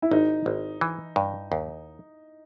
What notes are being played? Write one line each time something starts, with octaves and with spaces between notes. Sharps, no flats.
E4
G#1 D#4
G#1
E3
G2
D#2